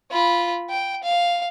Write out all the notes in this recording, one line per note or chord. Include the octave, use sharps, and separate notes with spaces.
F4 B5
G5
F5